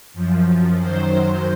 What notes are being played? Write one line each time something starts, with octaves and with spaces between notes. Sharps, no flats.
F#2 F3
F#2 D#3 F#3 C5